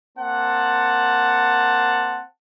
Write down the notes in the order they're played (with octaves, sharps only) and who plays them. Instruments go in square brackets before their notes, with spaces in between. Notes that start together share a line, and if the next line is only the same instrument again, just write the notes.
[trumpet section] A#3 C4 F#5 A5